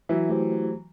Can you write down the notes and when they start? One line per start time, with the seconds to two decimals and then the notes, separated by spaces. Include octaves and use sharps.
0.09 E3 F#3 E5
0.29 A3 G4 C5